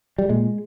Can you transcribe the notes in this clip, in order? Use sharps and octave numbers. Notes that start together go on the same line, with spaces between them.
G3
A#2 G#3